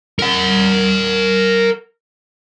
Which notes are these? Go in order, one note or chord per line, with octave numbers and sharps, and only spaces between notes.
A#4 F#5